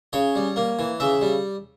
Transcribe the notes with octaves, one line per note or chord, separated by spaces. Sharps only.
C#3 C#5
G3
A#3
E3
C#3 E5
G3